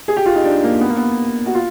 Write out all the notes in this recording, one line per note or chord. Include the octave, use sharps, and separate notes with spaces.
G#4
G4
F4
D#4
D4
A#3
B3
A#3
B3
F#4
F4